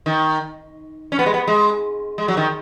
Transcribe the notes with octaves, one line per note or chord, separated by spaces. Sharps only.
D#3
C#4
B3
G#3
B3
G#3
G#3
F#3
D#3